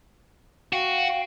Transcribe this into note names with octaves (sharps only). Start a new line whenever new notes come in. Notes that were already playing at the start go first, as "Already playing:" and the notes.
F#4 F5 G5